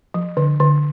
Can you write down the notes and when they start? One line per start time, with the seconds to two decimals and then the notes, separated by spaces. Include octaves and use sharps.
0.14 F3
0.37 D3
0.60 D3